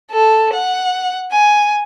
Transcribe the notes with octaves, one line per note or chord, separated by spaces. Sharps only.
A4
F#5
G#5